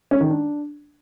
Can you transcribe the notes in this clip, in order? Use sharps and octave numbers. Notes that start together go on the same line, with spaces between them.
C#4
D#3
D4